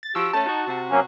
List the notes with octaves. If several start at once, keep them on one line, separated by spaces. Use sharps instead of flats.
A6
F3 F#4 G4 E6
A3 C#4 A5
D#4 F#4
C3 F#4
F#3 A#3 C#4